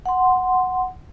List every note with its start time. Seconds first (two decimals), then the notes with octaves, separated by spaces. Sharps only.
0.06 F#5 C6